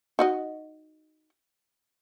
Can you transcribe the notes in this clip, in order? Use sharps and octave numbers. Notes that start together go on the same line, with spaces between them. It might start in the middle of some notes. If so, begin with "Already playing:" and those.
D#4 F#4 D#5